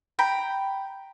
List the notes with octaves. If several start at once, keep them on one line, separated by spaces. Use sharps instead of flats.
G5 A#5 B5